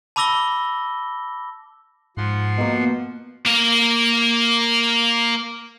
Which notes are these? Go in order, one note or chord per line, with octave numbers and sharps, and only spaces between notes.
A5 B5 D6 E6 A#6 G7
G#2 F3 F#5 C6
B2 A#3
A#3 F5